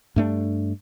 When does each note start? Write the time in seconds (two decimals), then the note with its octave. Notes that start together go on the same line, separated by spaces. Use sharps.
0.16 G2 A3 D4